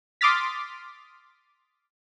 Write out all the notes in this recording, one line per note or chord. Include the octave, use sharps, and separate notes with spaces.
C6 D6 D#6 F6 A6 B6